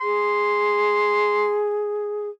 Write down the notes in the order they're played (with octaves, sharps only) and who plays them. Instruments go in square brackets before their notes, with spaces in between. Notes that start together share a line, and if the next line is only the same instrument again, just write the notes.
[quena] G#4 [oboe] C6